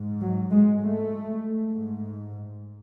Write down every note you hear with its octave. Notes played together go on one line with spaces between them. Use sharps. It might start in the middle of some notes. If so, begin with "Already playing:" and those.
Already playing: G#2
F#3
G#3
A3
G#2